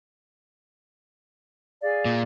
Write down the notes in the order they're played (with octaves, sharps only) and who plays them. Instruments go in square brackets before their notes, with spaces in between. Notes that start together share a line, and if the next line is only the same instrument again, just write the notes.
[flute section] G#4 D5 F5
[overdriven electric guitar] A#2